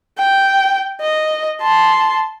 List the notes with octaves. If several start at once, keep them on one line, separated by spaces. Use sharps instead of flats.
G5
D#5
A5 C6